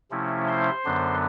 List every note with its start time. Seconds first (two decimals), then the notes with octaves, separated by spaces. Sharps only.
0.11 C3 F3 A3 C#4 E4
0.48 C5 C6
0.85 F#2 D3 F#3 B3 D4